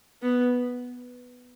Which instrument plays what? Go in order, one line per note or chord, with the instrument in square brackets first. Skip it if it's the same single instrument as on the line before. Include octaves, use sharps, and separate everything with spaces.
[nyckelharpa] B3